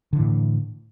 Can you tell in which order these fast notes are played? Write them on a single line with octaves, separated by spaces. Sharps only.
D3 E3 A2